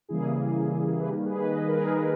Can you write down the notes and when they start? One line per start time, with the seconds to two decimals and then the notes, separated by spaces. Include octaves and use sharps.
0.09 C#3 E3 G3 A#3 E4 G#4
1.00 B4
1.08 D#3 G3 A#3 G4 A#4
1.25 G#4 B4
1.42 B4 D#5
1.59 B4
1.68 A#4
1.76 G#4 B4